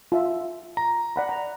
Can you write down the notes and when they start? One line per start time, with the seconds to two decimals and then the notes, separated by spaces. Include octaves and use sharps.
0.12 F4 E5
0.77 A#5
1.16 D5 F#5 B5
1.29 A#5